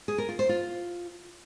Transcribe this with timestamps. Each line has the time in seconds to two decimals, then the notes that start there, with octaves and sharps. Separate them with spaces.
0.08 G#4
0.18 A#4
0.29 F4
0.39 C5
0.49 F4